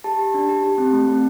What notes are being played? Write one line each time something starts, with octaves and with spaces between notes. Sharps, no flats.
G4 A5
G4
D4
G4
G4
C4
A3
C4